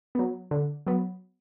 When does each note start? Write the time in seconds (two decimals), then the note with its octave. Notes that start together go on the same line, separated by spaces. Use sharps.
0.15 F#3 B3
0.51 D3
0.86 F#3 B3